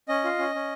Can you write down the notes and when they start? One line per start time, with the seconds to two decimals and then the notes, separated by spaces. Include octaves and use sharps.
0.08 C#4 D#5
0.24 F4
0.39 C#4
0.55 C#4